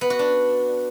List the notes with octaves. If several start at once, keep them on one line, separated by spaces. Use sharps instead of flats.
B3
F#4
D4